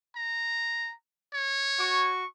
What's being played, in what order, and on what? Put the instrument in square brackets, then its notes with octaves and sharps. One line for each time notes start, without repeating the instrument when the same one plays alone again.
[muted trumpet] A#5
C#5
[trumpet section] F#4 C#6